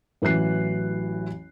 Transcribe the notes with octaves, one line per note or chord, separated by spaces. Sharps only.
A1 E3 F#3 F#6 C7